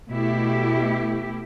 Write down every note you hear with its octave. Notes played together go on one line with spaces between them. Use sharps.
B2 A3 E4 G4